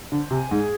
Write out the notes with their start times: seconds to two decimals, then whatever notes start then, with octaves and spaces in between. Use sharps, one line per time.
0.12 D3 C5
0.31 C3 G#5
0.51 G#2 G#4